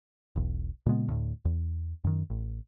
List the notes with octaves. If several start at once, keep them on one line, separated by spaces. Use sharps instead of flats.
E1 B1
A#2 C#3 G#3 B3
D2 A2
E2
F#2 D#3
A1